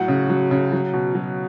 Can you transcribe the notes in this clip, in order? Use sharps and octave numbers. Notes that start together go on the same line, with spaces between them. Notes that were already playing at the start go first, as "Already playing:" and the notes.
Already playing: A2 F#3 F#5
C#3
F#3
C#3
F#3
B2
F#3